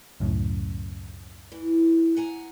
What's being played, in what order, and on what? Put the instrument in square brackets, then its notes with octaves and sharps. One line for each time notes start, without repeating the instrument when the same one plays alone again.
[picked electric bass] C#2 F#2 A2
[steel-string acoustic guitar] E3
F#5 G#5 A#5